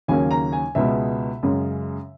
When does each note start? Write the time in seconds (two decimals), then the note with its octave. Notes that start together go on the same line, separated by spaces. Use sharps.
0.08 D#2 C#3 F#3 A#3 C#4 G#5
0.31 A#5
0.53 G#5
0.75 C#2 B2 G#3 E5
1.43 F#2 C#3 G#3